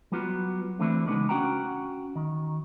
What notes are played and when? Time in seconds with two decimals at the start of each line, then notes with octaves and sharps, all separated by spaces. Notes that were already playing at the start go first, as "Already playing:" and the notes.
0.12 F#3 G3 B3 F4 F#4
0.79 D3 E3 A3 C4 D4 E4
1.07 C#3 G#3 A#3 B3 D4 D#4
1.29 C#4 F#4 F#5 G5 A#5
2.16 D#3